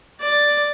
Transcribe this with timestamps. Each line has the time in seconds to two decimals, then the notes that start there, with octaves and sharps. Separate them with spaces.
0.20 D5